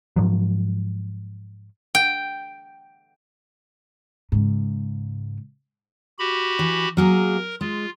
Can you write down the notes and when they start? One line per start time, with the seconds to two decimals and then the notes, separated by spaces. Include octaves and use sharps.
0.16 G#2 F3 F#3
1.95 G5
4.32 G#2 C#3
6.19 F#4 G4 B5
6.59 E3
6.97 F#3 A#3 G#4 A#4
7.61 G#3 F4